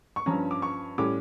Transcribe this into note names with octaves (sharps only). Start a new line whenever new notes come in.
C#6
G2 F3 C#4 A#5
D6
C#6
A2 G3 C#4 D6